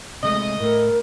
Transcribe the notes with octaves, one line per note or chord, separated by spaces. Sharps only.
C3 G#3 A3 D#5
A2 A3 A#4